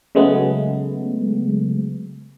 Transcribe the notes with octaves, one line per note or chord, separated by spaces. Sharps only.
C#3 F#3 G#3 A3 B3